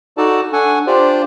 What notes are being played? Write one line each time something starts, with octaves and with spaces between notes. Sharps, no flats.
D#4 F#4 A4 D5 A5
D4 A4 F#5 G#5 C#6
D4 F4 G4 C5 D5